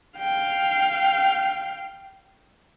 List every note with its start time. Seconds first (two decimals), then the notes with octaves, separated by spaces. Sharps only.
0.18 F5 G5